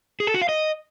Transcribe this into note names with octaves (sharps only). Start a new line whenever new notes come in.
G#4
A4
F#4
F5
D#5